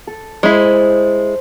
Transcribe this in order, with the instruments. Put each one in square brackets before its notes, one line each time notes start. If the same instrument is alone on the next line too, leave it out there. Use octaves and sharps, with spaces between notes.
[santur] A4
[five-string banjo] G#3 E4 [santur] C5